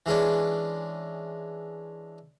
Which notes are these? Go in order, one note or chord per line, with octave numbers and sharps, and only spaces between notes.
E3 G#3 C#4 D4